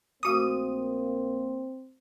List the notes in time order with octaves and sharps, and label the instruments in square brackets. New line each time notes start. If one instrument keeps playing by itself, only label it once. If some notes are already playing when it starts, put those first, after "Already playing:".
[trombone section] A#1 A#3 [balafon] A3 F#4 D6 [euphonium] C4 [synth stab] D#6 D#7